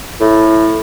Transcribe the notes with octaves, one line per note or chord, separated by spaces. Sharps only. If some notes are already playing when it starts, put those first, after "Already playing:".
A2